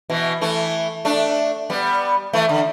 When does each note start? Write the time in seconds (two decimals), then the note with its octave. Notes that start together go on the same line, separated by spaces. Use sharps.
0.10 B2 E3
0.41 E3 A3
1.05 A3 D4
1.70 G3 B3
2.33 E3 A3
2.49 D3